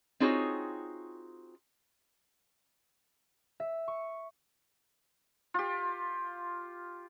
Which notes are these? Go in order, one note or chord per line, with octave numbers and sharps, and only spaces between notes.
C4 D#4 F4 F#4 G#4 C#5
E5
C#6
F4 G4